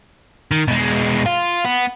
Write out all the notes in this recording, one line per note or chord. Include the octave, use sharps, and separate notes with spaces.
D#3
B2 G#3
F4
B3